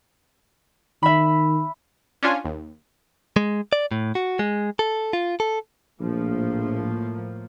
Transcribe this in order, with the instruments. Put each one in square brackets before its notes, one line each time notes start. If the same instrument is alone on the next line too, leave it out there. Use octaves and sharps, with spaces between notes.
[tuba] D#3 [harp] E5 B5
[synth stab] C#4 D4 F4 G#5
D#2
[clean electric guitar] G#3
D5
A2
F#4
G#3
A4
F4
A4
[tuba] A#1 [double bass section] A2 F3 A#3